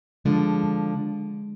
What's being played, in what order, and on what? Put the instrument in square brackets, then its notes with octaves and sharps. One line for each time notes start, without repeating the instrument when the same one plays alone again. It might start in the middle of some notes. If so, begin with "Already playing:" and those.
[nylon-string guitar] D3 F3 [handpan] G#3
[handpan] G#3